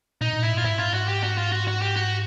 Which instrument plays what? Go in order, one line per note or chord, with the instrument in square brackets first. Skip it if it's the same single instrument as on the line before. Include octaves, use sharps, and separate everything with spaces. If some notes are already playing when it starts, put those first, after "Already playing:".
[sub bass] A#2 [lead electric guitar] D#4
[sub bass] A#2
[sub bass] A2 [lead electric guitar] E4
[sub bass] G#2
[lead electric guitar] F4
[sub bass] G#2 [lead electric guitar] E4
[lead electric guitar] F4
F#4
G4
F#4
F4
F#4
F#4
G4
F#4